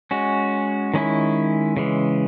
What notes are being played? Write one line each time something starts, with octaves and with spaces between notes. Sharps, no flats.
G#3 C#4 F#4
D#3 G#3 C#4 E4
C#3 E3 G#3